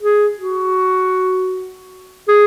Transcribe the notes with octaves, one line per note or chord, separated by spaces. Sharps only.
G#4
F#4
G#4